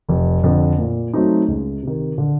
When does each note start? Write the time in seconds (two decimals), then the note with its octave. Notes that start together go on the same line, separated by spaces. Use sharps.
0.09 F1
0.44 F2 D3
0.79 A#2
1.14 F#3 A3 C4 D#4
1.48 C#2
1.83 C3 D#3
2.18 D3